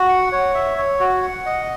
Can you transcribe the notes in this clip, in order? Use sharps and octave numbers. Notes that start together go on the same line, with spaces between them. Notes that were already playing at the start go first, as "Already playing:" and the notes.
Already playing: F#4
F#5
C#5
E5
C#5
F#4
F#5
D#5